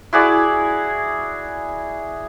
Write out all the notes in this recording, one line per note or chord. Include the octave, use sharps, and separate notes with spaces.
E4 F#4 G#4 D5